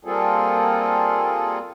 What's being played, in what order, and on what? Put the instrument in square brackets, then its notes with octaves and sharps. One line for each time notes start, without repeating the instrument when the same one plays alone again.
[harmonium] G3 A#3 C4 F4 G#4 A4